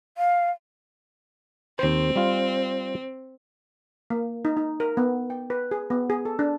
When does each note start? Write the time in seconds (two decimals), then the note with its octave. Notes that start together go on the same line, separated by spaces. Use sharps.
0.18 F5
1.79 D#2 C4 C5
2.16 G3 F4
4.10 A#3
4.45 D#4
4.57 D#4
4.80 A#4
4.97 B3
5.30 G5
5.50 B4
5.71 G#4
5.90 B3
6.10 G#4
6.25 A4
6.39 D4